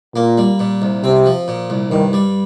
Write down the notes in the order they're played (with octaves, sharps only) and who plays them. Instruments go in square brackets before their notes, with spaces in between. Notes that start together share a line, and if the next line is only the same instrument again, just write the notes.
[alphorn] A#2 [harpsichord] A#3
[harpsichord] G3
A#2
C2
[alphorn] C3 [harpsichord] C4
[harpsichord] F3
A#2
C2
[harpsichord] G2 [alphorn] D#3
[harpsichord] G3